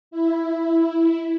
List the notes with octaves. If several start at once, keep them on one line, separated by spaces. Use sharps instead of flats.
E4